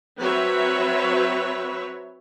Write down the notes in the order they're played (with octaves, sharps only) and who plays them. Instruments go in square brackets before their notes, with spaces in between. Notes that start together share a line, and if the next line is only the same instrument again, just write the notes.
[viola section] F#3 C4 B4 C#5 E5